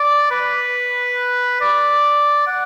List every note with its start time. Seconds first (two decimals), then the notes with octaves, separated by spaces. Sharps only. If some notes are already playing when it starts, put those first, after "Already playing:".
Already playing: D5
0.31 B4
1.61 D5
2.47 F#5